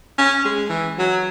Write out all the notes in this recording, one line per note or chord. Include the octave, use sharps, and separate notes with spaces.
C#4
G#3
E3
F#3